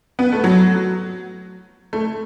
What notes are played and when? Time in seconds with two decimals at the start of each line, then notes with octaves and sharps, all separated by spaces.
0.19 B3
0.33 A3
0.44 F#3
1.93 A3